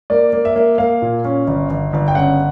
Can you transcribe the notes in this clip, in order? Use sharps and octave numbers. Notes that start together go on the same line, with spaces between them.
A#3 D5
A#3
E5
A#3
A#3 F5
A#2
C#4
G1
G1
G1
G5
C#3 F#5